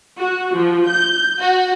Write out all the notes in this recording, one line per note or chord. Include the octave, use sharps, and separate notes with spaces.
F#4
F3
G6
F#4